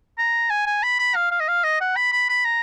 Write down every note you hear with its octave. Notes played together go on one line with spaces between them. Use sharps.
A#5
G#5
G#5
B5
B5
F5
F5
D#5
F5
D#5
F#5
B5
B5
B5
A#5